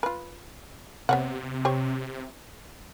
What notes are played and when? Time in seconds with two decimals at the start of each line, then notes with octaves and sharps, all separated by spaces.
0.03 F4 B4
1.09 C3 B3 C#5 F#5
1.65 G4 C5 C#5